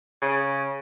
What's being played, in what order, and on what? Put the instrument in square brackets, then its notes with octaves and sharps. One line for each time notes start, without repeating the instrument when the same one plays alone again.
[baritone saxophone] C#3